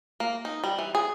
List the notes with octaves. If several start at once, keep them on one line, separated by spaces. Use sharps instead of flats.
A#3
D#4
G3
E3
G#4